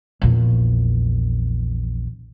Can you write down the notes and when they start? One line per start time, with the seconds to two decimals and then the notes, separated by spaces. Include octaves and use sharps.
0.22 A#1 E2